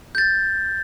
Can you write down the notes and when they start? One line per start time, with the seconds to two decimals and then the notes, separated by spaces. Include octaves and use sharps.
0.15 G6 A6